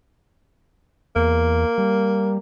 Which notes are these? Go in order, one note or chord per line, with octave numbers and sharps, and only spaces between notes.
E2 A#3
G3